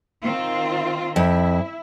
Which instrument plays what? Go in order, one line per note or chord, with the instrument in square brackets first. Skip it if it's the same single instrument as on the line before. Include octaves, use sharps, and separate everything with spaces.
[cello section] D#3 C4 F4
[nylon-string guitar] F2 [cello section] E4